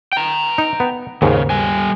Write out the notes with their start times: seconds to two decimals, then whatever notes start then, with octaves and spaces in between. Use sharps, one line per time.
0.13 G5 A#5
0.58 D#4
0.80 B3
1.22 D#2 G#2 C#3
1.50 G3 G#5